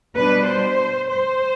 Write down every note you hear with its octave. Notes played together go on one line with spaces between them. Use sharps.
B2 G3 D4 B4
C5
C5